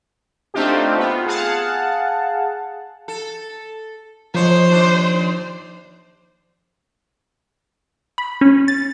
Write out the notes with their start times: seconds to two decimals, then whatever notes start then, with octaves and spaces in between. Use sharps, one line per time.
0.54 A3 C4 D4 D#4 F4 G4
0.98 B3 F4
1.26 G#4 F5 F#5 A5
3.08 A4
4.34 F2 F3 C5 C#5
4.68 D#2 D4
8.18 B5
8.41 C#4
8.68 A6